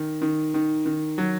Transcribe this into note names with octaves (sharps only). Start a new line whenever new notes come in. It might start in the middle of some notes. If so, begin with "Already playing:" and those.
Already playing: D#3
D#3
D#3
D#3
F#3